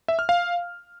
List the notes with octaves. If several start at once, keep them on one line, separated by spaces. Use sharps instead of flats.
E5
F6
F5